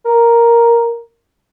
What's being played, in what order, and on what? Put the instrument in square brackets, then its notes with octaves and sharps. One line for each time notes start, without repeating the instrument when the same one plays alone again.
[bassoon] A#4